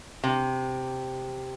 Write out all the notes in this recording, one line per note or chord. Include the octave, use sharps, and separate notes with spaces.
C3